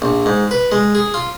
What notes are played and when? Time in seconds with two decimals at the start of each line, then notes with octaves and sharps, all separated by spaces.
0.02 A#1
0.26 G#2
0.51 B4
0.72 G#3
0.95 G#4
1.14 F4